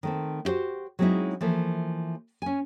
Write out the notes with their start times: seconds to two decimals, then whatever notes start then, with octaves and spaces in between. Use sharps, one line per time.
0.03 D#3 A3 C4
0.45 E4 F#4 G4 C5
0.99 F#3 G#3 C4 C#4 D#4 E4
1.41 E3 F3 A3 A#3
2.42 C#4 G#5